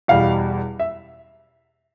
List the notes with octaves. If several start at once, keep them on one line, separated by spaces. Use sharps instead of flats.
E2 B2 G3 F5
E5